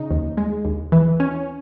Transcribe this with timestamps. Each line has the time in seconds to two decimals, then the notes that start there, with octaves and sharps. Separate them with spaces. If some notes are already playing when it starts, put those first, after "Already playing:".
Already playing: C#3 D#4
0.11 D#2
0.37 G#3
0.65 D#2
0.92 E3
1.20 C#4